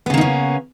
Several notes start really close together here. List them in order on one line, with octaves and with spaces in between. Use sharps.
B3 C#3 A#3 D#4 C#4